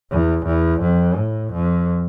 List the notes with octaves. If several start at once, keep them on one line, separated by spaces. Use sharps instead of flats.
E2
E2
F2
A2
F2